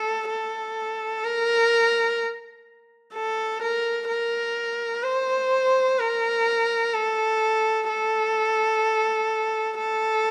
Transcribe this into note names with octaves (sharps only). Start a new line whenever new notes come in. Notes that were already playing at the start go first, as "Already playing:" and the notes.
Already playing: A4
A4
A#4
A4
A#4
A#4
C5
A#4
A4
A4
A4